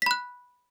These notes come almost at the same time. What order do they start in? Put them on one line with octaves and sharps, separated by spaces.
B6 B5 F#6